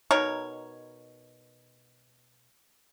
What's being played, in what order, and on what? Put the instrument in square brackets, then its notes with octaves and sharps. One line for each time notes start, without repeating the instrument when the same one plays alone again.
[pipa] B2 D#4 A#4 C#5